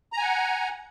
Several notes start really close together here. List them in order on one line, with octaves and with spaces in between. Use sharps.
A#5 G#5 F#5